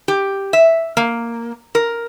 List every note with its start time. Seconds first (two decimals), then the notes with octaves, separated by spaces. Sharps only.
0.08 G4
0.53 E5
0.97 A#3
1.75 A#4